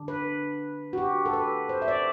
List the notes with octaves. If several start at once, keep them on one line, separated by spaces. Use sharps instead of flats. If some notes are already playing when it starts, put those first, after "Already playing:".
Already playing: D3 G3 D4
B4
F#4
G4
A4
B4
C5
E5
D5